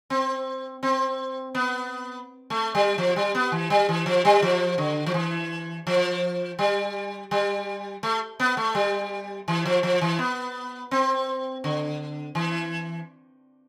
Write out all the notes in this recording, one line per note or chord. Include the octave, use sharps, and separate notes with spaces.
C4
C4
B3
A3
G3
F3
G3
B3
E3
G3
E3
F3
G3
F3
D3
F3
E3
F3
G3
G3
A3
B3
A3
G3
E3
F3
F3
E3
B3
C4
D3
E3